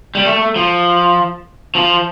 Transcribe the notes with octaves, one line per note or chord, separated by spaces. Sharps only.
G3
A3
F3
F3